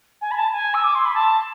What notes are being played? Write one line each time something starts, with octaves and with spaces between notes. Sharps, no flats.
G#5
B5
A5
G#5
E6
D6
C6
B5
A5